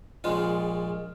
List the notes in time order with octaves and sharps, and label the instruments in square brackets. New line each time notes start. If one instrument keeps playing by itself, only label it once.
[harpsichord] A#1 A#2 G#3 F4